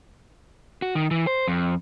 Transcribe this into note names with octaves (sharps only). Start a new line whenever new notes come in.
F#4
D#3
E3
C5
F2